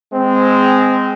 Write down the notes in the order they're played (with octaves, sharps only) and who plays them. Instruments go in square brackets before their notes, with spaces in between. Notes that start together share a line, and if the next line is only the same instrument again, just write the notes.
[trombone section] G#3 C4